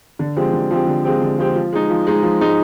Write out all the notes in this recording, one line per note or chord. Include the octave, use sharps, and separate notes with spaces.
D3
F3 G#3 C4 G4
D3
F3 G#3 C4 G4
D3
F3 G#3 C4 G4
D3
F3 G#3 C4 G4
F3
G#3 D#4
F3
G#3 D#4
F3
G#3 D#4